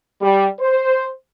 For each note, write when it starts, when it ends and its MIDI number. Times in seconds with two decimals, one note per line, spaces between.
0.21 0.46 55
0.60 1.06 72